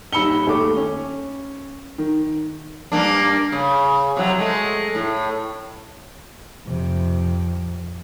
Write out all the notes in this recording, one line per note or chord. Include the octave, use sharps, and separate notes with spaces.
D#1 D#4 B5 E6 C#7 G7
D#2 A3 D6
C#4
D#3
G2 A#3 D4
C#3
C3 F#3
G#3 A3
A2
F2 C3